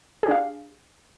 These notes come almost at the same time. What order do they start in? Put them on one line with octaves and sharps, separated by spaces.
G#4 G4 D4 F5